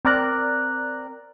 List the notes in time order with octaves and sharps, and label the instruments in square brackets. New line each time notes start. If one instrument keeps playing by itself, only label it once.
[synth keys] C4 A#4 D5 A#5 F#6